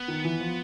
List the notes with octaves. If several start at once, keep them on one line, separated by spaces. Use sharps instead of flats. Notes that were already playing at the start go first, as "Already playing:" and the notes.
Already playing: B3
D#3
E3
F3